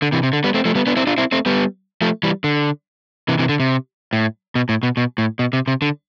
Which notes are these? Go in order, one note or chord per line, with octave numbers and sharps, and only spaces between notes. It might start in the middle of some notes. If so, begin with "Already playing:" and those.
D3
C3 E3
C3
D3
G3 B3
A3 C4
F3 A3
G3 B3
B3 D4
C4 E4
D4 F4
C4 E4
A3 C4
G3 B3
F3 A3
E3 G3
D3
C3 E3
C3 E3
D3
C3
A2
B2
A2
B2
B2
A2
B2
C3
C3
D3